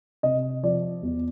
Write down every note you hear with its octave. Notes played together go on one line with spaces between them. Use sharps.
C3 D#5
F3 D5
E2